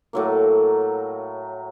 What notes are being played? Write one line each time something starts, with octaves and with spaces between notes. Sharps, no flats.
A2 F#3 A#3